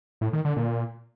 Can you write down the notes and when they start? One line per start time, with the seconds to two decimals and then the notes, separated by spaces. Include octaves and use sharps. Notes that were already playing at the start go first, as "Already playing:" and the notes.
0.21 A2
0.33 D#3
0.45 D3
0.56 A#2